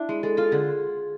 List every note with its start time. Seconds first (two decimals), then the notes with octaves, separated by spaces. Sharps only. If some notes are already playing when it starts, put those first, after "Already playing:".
Already playing: D4 E4
0.09 G#3
0.23 G#3 A4
0.37 F4 A4
0.52 D3 G#4